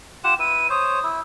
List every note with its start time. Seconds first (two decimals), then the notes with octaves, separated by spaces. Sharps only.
0.24 F4 G4 F#5 E7
0.39 E4 B4 D#7
0.70 C5 C#5 D#6
1.03 E4